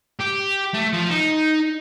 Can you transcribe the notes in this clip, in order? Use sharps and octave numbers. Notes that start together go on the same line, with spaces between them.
G4
A3
F3
D#4